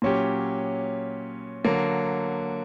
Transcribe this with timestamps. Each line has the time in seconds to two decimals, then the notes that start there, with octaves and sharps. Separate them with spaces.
0.02 A#2 F#3 C#4 G4
1.64 D3 F#3 A#3